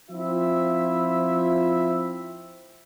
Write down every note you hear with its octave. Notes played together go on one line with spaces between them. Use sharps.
F3 C4 E4 F4 E5